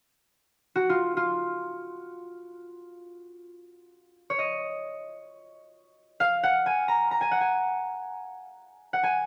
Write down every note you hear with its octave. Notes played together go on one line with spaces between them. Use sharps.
F#4
F4
F4
C#5
D#5
F5
F#5
G#5
A#5
A#5
G#5
F#5
G#5
F#5
G#5